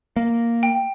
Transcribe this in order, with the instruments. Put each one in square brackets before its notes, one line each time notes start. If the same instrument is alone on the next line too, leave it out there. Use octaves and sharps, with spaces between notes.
[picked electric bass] A#3
[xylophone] G5